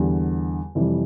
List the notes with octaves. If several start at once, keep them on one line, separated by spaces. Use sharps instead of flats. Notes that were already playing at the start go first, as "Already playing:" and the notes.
Already playing: E2 D3 G3
F2 C3 E3 G3